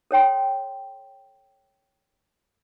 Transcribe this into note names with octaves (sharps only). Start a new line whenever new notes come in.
A4 C#5 G5 C6